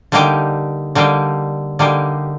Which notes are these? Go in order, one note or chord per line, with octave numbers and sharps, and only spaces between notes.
D3 G3 A#3 D#4 G4
D3 G3 A#3 D#4 G4
D3 G3 A#3 D#4 G4